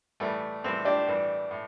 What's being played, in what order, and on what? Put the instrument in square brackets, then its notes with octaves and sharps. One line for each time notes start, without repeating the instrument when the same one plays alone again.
[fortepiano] A2 E3 G3 A3
A2 E3 G3 C4
D4 G4
A2 E3 G3
A2